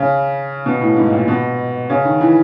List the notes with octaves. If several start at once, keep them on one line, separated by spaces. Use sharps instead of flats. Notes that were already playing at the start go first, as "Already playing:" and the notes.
Already playing: C#3
B2
A2
G#2
A#2
B2
C#3
D#3
E3